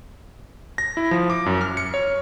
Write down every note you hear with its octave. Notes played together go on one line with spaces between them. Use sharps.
A#6
E4
F3
D6
F#2
F6
C#7
C#5